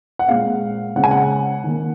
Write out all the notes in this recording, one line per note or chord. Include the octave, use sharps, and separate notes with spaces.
F#5
A#2 G#3 C4 F5
C#3 G#3 C4 F#5
G#5
F#5
D#3 A#3